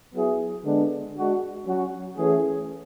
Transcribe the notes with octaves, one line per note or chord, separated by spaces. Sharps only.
F#3 B3 E4 G#4
D3 G#3 B3 D4
G#3 D4 F#4
F#3 C#4 F#4
E3 A3 C#4 G#4